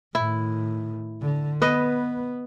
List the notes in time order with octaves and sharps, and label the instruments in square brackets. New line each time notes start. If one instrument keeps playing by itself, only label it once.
[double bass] A2 D#3 [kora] E4
[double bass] D3
[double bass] B3 [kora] B4 D#5